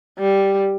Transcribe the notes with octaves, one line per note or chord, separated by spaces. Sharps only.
G3